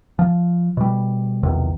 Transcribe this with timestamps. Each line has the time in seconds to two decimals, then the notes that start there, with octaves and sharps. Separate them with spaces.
0.19 F3
0.77 B2 G3
1.43 B1 E2 C3 D#3